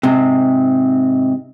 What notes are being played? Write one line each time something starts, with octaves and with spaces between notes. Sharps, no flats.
G#2 C3